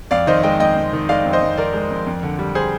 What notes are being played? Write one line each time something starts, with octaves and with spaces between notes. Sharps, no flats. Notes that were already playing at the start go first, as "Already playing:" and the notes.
F2 D5 F5
D#3 C5 D#5
G#3 D#5 G5
F2 D#5 G5
F2
D#3
G#3 D5 F5
F2
C5 D#5
F2
D#3 A#4 D5
G#3
F2
F2
D3
G3
G#4 C5